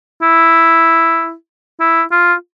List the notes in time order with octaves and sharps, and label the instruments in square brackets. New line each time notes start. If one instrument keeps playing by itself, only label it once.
[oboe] E4
E4
F4